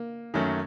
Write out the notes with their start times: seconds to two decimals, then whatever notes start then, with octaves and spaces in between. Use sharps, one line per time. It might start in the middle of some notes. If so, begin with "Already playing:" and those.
Already playing: A#3
0.34 F#2 D#3 F#3 A3 C#4